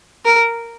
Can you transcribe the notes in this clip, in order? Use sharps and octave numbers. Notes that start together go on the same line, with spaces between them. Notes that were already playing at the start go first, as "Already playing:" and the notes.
A#4